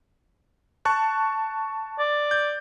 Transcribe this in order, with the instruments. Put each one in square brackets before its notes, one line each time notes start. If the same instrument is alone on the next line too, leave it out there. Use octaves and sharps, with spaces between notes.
[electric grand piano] A5 C#6 F#6
[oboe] D5
[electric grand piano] G6